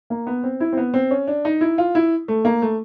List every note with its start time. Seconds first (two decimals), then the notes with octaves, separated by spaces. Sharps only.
0.10 A#3
0.27 B3
0.43 C4
0.60 E4
0.73 C4
0.77 B3
0.94 C4
1.11 C#4
1.27 D4
1.45 D#4
1.61 E4
1.78 F4
1.95 E4
2.28 A3
2.45 A#3
2.62 A3